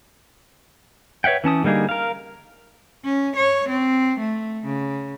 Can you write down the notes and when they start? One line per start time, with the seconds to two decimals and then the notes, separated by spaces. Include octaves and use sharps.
1.24 B4 C#5 E5 F#5 G5
1.44 E3 C#4 A5 D#6
1.64 D3 G3 A#3 D#4 G#4
1.89 A#4 F5
3.04 C#4
3.36 C#5
3.69 C4
4.19 A3
4.66 C#3